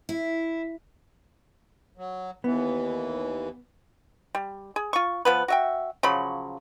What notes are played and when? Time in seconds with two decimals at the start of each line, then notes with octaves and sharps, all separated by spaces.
0.09 E4
1.97 F#3
2.44 D#2 E3 B3
4.35 G3
4.76 G#4
4.93 F4 C#6
5.25 F3 B3 B4
5.48 F#4 E5 G5
6.03 C#3 F3 F#3 B5